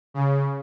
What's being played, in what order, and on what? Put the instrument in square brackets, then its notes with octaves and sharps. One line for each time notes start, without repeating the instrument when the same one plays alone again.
[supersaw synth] C#3